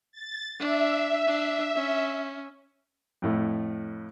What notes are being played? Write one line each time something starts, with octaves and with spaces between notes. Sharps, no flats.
A6
D4 E5
D4
C#4
F2 A2 A3